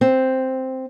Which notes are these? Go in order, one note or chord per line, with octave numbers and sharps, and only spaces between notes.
C4